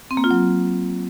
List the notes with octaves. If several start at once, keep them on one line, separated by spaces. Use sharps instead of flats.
C4
A#3
F4
F#3